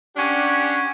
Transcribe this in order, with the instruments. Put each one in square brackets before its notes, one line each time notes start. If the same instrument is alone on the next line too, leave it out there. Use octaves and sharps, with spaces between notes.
[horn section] C#4 D4 G4 F#5